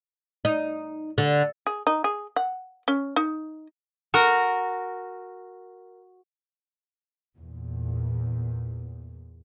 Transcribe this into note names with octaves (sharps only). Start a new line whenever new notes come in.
D#4
D3
G#4
D#4
G#4
F#5
C#4
D#4
F#4 A#4
E2 A#2